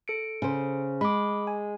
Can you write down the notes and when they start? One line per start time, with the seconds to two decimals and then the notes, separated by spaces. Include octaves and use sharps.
0.08 A4 C#7 D7
0.42 C#3 C5
1.01 G#3 B5 D6
1.47 G#5